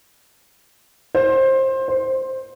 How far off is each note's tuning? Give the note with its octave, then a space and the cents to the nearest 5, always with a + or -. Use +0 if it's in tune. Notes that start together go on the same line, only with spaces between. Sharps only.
C5 +20
C5 +5